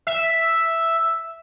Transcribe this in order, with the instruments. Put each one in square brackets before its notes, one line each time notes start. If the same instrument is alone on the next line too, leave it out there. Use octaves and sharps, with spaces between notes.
[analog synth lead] E5